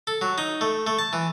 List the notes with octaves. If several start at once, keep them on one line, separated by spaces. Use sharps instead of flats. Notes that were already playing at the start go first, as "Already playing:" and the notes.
A4
F#3
D#4
A3
A3
A5
E3